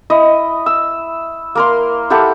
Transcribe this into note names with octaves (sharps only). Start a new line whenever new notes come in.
E4 D#5
E6
A#3 A#4 C6
E4 G4 A4 F#5